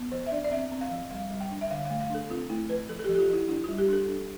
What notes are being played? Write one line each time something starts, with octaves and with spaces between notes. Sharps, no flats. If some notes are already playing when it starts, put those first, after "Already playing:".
Already playing: B3
F3 C5
E5
D4 D5
D5
C4 E5
C4
F5
F3
G3 F5
G3
G5
D4
E5
D3 F5
A3 F5
F5
D4 A4
C4 F4
A3 E4
F3 B4
F3 A4
A4
G4
F3
G4
F4
F3 E4
D4 E4
G3 F4
G4
D4 A4
D4